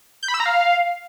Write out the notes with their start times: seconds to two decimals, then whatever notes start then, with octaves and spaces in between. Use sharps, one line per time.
0.23 G6
0.28 B5
0.34 E6
0.40 A#5
0.46 F5